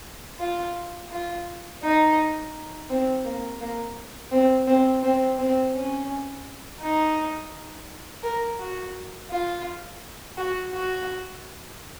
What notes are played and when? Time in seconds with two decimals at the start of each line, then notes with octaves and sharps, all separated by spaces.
0.40 F4
1.12 F4
1.82 D#4
2.90 C4
3.25 A#3
3.60 A#3
4.31 C4
4.67 C4
5.03 C4
5.39 C4
5.74 C#4
6.81 D#4
8.23 A#4
8.59 F#4
9.30 F4
10.37 F#4
10.73 F#4